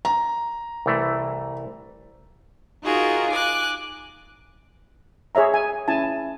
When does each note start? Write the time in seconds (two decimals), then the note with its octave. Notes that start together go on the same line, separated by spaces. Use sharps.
0.05 A#5
0.86 C2 E3 A3
2.83 D#4 F4 F#4 G#4 A#4
3.31 G#5 D6 F#6
5.35 G#4 C#5 E5 A#5
5.54 G#5
5.88 C#4 E4 G#5 A5